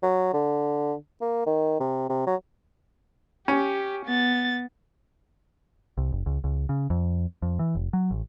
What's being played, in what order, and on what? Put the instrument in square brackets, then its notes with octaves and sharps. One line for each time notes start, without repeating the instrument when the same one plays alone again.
[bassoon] F#3
D3
A#3
D#3
C3
C3
F#3
[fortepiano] C#4 [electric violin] G4
[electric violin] B3 A6
[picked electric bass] C2
F#1
C#2
C#2
C#3
F2
F2
E3
F1
F#3
A1